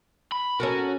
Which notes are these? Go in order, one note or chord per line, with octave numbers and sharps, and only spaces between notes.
B5
C#4 F#4 A4 A#4